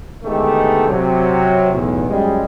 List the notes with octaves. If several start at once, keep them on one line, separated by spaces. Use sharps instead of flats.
D3 D#3 G#3 A3 B3 G4
C3 F#3
B1 E2 A2
F#2 G3 G#3